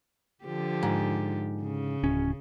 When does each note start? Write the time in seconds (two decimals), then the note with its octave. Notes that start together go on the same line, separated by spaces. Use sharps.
0.45 D3 F3 G4
0.83 G#2
1.62 C#3
2.04 D1 C#4